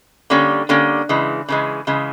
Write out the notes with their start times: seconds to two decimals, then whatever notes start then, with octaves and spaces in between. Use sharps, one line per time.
0.30 D3 G3 A#3 C#4
0.69 D3 G3 A#3 C#4
1.09 C#3 E3 G#3
1.49 C#3 E3 G#3
1.87 C#3 E3 G#3